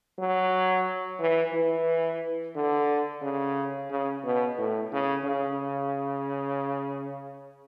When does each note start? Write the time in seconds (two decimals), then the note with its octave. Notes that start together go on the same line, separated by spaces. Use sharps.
0.19 F#3
1.19 E3
1.53 E3
2.55 D3
3.22 C#3
3.90 C#3
4.24 B2
4.58 A2
4.92 C#3
5.25 C#3